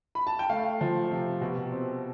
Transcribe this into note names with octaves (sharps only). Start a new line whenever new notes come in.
B5
A5
G5
A3 F5
F3
C3
B2
C4